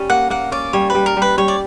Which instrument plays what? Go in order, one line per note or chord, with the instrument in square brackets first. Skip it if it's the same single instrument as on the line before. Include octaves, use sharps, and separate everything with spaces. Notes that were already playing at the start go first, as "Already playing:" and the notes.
Already playing: [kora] G3 C#4
[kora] A#3 [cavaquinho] F#5
[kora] A#3 [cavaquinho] F#5
[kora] C#4 [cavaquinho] D5
[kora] G3 [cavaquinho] C#5
[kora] G3 [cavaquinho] B4
[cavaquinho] A#4
[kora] G3
[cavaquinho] B4
[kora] G3 [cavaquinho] C#5
[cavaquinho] D5